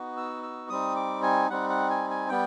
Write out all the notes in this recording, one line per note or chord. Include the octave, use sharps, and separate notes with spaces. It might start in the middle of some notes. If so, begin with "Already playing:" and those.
Already playing: B3 D#4 F#4
E6
E6
G3 C4 D#4 D#6
D6
G#5
G3 C4 D#4 F#5
F#5
G#5
G#5
G3 B3 G5